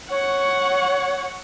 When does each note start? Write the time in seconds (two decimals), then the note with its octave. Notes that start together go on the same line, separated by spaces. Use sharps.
0.10 C#5 F#5 C#6